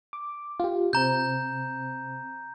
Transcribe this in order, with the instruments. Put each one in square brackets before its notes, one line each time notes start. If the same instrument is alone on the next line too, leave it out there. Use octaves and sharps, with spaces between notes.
[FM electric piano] D6
F4 G4
[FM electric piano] C3 C4 [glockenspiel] A#5 G6